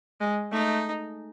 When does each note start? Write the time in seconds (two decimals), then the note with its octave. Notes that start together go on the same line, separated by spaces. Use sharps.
0.21 G#3
0.52 A3 D#4